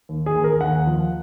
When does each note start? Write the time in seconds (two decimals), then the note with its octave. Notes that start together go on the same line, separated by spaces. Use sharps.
0.09 D#2
0.26 G#4
0.35 D#2
0.44 A#4
0.61 D#2 F#5
0.87 F3